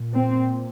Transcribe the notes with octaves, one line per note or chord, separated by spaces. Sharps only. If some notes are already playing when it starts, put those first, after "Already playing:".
Already playing: A#2
C4